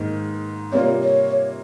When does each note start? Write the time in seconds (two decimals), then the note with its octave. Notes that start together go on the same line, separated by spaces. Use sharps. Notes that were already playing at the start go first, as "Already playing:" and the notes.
Already playing: G#2 D#3 A#3
0.72 C3 G3 A#3 F4 C#5
1.03 C#5